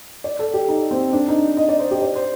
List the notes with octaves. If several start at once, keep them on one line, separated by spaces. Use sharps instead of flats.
D5
A4
G4
D#4
C4
D4
D#4
D#5
D5
C5
G4
D5
C5